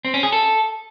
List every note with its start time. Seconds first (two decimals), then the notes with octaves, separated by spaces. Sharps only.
0.05 C4
0.14 C#4
0.23 G#4
0.32 A4